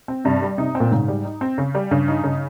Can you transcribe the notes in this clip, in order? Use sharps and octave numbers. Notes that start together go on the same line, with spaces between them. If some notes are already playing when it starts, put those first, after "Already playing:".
C4
G2 C3
G3
C3 D#4
C4
A#2
G#2 C#3
G3
D#4
C4
C#3
G3
G2 C#3
D#4
C#3